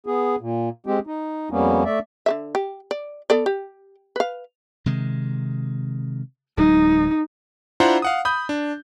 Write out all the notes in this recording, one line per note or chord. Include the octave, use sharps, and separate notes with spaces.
B3 G#4
A#2
G#3 C4 G4
D#4
F2 G3 A#3 B3 C#4
A3 D5 E5
D3 A#3 E5
G4
D5
B3 A4 D5
G4
B4 F5
C3 D#3 G#3
D1 F#3 G#3 D#4
D4 E4 F4 C5 F#5 A#5
F5 F#5 D#6
B5 D#6 G6
D4